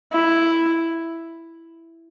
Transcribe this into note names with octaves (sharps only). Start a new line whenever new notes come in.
E4